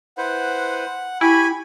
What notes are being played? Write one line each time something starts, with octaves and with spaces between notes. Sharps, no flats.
E4 B4 C5 F#5
E4 G4 G#5 B5 C#6